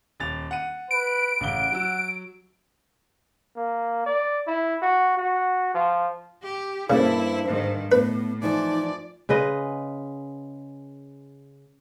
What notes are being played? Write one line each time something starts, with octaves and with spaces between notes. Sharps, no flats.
D#1 A6 F7
F#5 D#7
B4 D7
A1 C#3 F#5 G7
F#3 E6
A#3
D5
E4
F#4
F#4
F3
G4
G2 C#3 A#3 E4 A4 C5
G#2 D#3
A2 B3 B4
E3 F3 D#4 A4 D5
C#3 G#3 B4 D#5